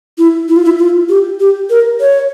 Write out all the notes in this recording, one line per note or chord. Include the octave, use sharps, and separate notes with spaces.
E4
E4
F4
E4
F4
G4
G4
A#4
C#5